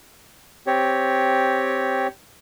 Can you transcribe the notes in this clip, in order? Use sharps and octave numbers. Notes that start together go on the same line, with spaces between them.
C4 G4 C#5